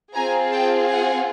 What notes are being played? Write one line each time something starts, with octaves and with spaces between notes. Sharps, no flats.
C4 F4 G#4 G#5 A#5
G5 A5
F#5 G#5